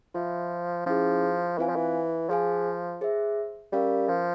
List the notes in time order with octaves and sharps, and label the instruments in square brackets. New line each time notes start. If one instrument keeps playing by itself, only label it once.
[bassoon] F3 [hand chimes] F4 C5 E5
[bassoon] F3 [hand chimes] C#4 E4 G#4
[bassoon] E3 [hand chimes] C4 F4 C5 F5 G#5
[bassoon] F3
E3
[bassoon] F3 [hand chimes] G#4 C5 F5 G#5
[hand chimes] G#4 C5 E5
[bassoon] G3 [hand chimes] C#4 G4 A#4 F5
[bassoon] F3